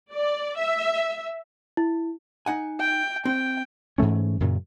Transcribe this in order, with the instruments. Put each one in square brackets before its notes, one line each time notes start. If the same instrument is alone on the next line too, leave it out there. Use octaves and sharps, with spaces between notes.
[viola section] D5
E5
[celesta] E4
[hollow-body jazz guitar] D#4 F#5 G#5
[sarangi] G5
[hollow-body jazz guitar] C4 [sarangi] G5
[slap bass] G#2 E3 A3 C#4
F#2 A#2 C#3